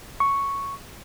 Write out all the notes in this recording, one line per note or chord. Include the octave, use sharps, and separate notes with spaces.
C#6